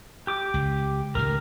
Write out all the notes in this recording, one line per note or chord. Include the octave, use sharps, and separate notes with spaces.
G4 D6
C#2
C#2 A2 D#3 A#4